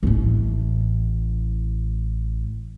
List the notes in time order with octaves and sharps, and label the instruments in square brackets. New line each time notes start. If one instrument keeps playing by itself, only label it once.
[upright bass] A1 A2